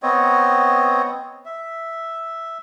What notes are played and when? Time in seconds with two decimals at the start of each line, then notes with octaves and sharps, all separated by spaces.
0.03 B3 C4 C#5 D#5
1.45 E5